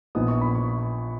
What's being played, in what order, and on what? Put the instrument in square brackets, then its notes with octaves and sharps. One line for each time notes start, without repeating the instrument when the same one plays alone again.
[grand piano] A#1 A#2 F3 B3 D#4 D#6
C#6
B5
C#6